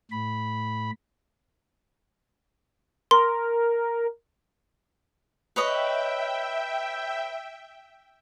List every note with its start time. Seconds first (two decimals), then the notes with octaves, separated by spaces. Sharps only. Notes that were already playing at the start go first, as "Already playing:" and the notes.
0.11 A2 B5
3.11 A#4 C6
5.56 B4 C#5 D#5 E5 G5